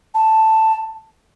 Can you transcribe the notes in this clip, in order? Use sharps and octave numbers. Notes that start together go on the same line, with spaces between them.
A5